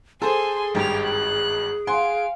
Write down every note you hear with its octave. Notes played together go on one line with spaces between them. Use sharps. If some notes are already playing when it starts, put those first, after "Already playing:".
G#4 A4 C5 G#5 C6
G#1 G2 G4 F7
F#6
F5 F#5 G#5 C6 D7